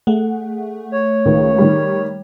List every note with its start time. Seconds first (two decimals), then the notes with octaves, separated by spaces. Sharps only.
0.07 A3 G#4 F#5
0.92 C#5
1.25 C#2 D#3 B4
1.58 D#3 G3